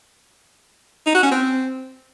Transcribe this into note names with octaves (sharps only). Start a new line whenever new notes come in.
D#4
F#4
C#4
C4